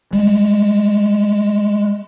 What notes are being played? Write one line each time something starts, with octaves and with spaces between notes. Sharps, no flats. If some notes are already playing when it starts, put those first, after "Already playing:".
G3 G#3